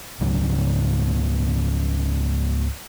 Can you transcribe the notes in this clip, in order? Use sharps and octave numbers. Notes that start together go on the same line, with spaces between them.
C#2 G#2 C#3 F#3